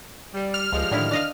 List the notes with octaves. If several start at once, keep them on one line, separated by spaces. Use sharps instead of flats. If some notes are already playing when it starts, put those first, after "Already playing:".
G3
F6
C#2 F3 G3 G#3
A2 D3 D#3 E4
D4 D#5 F5